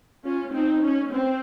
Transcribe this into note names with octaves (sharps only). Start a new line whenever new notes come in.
C#4 F4
C4 D#4
C#4
C4